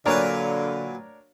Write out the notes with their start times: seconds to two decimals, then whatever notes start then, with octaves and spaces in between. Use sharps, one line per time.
0.06 A#2 D3 F#3 D4 A#4 B4 C#5